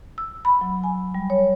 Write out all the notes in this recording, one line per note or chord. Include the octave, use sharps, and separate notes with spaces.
E6
B5
F#3
G#5
G3
C#5